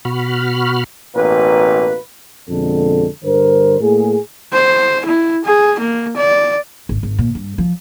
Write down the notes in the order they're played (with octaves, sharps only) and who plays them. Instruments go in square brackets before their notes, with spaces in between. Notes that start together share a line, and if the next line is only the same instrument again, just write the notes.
[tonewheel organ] B2 F#4 B5 F6
[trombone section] A1 B2 A#3 B4
F2 B2 D3 G#3 A4
G2 D3 A#4 C5
A2 A#3 G#4
[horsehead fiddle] C5
E4
G#4
A#3
D5
[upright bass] G#1
G#1
A#2
G2
F3